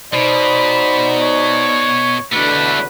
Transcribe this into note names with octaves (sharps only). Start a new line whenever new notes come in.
B2 D#4 C5 D5 B5
C#5
E2 B2 D3 A3 D4 B4